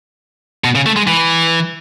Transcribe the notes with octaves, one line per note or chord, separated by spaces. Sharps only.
B2
C#3
A3
G#3
E3